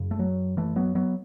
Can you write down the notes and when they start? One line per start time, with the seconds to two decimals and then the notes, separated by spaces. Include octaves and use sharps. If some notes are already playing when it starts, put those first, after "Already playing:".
Already playing: F#2 C#3
0.11 A3
0.19 F#3
0.57 E3 A3
0.76 F#3 B3
0.95 F#3 B3